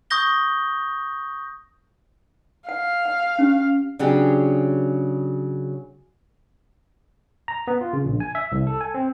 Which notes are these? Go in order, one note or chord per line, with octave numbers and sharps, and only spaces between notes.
C#6 D#6 G6 A#6 G7
F5 F#5
F#5
C#4 G4
C#3 F#3 D4 G4 G#4
A#5
B3
F4
C#3
A#1
G#5
E5
C2
A4
G#5
C4